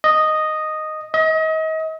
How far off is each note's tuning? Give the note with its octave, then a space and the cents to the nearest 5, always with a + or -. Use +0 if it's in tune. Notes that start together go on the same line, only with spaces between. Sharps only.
D#5 -5
D#5 +35